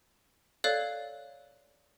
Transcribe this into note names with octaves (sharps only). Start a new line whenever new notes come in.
A4 C#5 D5 F5 F#6